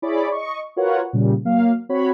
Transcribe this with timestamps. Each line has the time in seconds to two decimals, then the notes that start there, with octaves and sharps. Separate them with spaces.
0.02 E4 G#4 C#5 D5 B5 D6
0.32 D#5 C#6
0.76 F4 F#4 A#4 B4 C#5 F#5
1.13 A#2 C#3 G3
1.45 F#3 A#3 F5
1.89 C4 F#4 C#5 B5